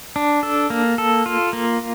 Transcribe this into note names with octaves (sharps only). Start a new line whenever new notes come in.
D4
A4
A#3
A4
F4
A#3